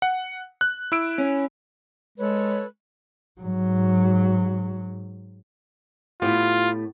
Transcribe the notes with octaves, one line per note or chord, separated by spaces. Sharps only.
F#5
F#6
E4 E6 D7
C#4
G#3 A4 B4 C#5
G#2 F#3
A2 B3 F4 G4